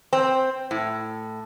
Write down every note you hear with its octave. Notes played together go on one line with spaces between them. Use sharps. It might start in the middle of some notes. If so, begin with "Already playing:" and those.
C4
A2